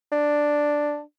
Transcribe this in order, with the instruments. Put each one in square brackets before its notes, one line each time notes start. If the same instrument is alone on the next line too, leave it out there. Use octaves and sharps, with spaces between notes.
[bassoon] D4